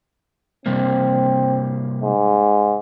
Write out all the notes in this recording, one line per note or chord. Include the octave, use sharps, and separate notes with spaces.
C3 G3 A#3 C4
G#2